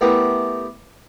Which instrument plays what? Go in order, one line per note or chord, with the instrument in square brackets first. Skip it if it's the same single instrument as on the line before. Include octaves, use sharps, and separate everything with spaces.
[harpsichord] A3 B3 E4 G4 A#4